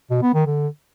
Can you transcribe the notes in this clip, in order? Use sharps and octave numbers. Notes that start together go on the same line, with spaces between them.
B2
B3
D#3
D3